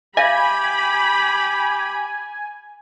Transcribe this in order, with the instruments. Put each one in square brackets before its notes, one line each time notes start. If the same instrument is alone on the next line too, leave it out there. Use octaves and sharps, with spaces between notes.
[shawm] G4 [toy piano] E5 F5 [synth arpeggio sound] G#5 [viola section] B5